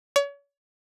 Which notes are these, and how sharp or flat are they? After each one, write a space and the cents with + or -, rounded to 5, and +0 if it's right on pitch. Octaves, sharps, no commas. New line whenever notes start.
C#5 +35